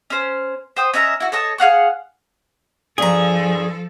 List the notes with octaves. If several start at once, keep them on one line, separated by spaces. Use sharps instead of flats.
C#4 C5
C5 G5 D#6
C#4 D#5 E5 A#5
E4 F#4
A4 C#5 D#5 A5
G#4 F5 F#5 C#6
G2 F3 G#4 A4 A#5